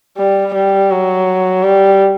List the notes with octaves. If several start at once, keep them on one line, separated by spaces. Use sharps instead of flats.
G3
G3
F#3
G3